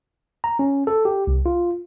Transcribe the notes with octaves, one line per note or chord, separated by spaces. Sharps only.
A#5
C#4
A4
G4
C2
F4